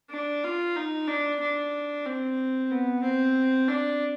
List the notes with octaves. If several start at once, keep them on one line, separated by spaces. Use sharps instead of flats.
D4
F4
D#4
D4
D4
C4
B3
C4
D4